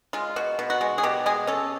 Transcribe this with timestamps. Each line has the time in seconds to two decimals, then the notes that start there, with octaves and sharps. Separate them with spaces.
0.13 G#3 F4
0.36 B2 F#4
0.59 B2
0.70 F#4
0.81 G#3
0.98 G#4
1.03 B2 G4
1.26 G#3 G#4
1.47 C#4 A4